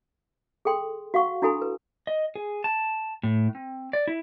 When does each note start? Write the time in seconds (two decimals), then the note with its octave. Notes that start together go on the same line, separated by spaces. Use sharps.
0.65 G#4 A4 G5 C6
1.14 F#4 F5 F#5 C#6
1.42 D4 E4 F#4 A4 G#5 B5
1.62 B4
2.07 D#5
2.35 G#4
2.64 A5
3.23 A2
3.55 C4
3.93 D5
4.07 E4